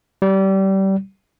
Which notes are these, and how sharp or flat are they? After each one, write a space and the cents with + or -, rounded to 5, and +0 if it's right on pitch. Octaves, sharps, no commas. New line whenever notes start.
G3 -25